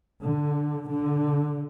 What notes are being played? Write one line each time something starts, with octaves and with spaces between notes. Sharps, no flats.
D3
D3